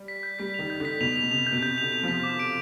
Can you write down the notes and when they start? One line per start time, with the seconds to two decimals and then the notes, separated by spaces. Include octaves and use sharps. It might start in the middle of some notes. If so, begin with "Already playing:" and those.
Already playing: G3
0.08 B6
0.23 G6
0.39 G3 B6
0.54 D#3 F7
0.70 G6
0.80 D3
0.85 B6
1.01 B2 F7
1.16 F7
1.23 B2
1.31 C3 F7
1.47 G6
1.52 B2
1.62 C3 G6
1.78 D3 F7
1.93 F7
2.03 F3 B6
2.23 D6
2.39 D7